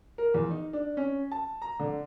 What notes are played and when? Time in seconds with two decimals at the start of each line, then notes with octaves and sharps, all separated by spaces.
0.18 A#4
0.34 E2
0.50 D#4
0.73 D4
0.97 C#4
1.32 A5
1.62 A#5
1.79 D3